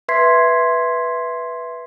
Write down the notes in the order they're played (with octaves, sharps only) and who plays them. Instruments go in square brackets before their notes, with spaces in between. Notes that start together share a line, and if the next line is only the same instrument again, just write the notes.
[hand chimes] B4 E5 C6 G#6 B6 C7